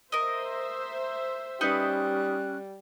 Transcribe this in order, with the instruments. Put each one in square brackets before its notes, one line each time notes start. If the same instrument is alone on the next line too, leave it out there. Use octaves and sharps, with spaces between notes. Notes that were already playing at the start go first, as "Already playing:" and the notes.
[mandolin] A#4 D#5 [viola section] C5 E5
[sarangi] G3 [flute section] C#4 F#6 [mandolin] D#4 B4 D#5